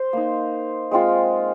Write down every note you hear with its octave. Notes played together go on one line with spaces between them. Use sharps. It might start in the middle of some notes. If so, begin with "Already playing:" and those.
Already playing: C5
A#3 D#4
G#3 C4 F4